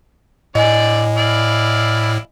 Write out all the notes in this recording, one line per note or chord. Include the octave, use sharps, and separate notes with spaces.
A2 D3 D5 D#5 G#5
E4 D5 F5